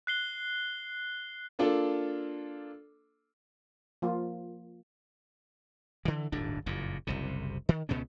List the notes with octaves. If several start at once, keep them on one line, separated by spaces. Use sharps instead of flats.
F#6 C7 G7
A#3 D4 F4 A4
F3 A#3 F4
D3 E3
D1 G1 G#2 D4
F#1 F2 A#2
F#1 C2 C3
D#3
C#2 B2 B3 C#4